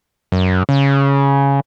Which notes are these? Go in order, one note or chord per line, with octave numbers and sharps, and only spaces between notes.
F#2
C#3